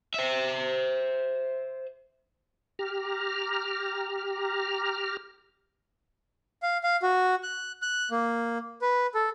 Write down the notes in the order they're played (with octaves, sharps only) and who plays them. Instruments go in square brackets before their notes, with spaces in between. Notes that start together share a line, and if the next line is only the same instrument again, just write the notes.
[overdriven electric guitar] C5 E5
[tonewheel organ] G4 A#5 F6
[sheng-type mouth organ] F5
F5
F#4
F#6
F#6
A#3
B4
A4